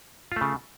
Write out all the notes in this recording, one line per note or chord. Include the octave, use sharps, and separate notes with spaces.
C#3 A3 F4